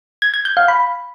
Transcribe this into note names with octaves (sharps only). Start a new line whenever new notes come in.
G#6
G#6
G6
F5
B5